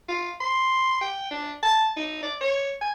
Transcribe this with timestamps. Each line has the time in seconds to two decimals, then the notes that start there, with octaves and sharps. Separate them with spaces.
0.09 F4
0.41 C6
1.01 G5
1.31 D4
1.63 A5
1.97 D#4
2.23 D5
2.41 C#5
2.81 G#5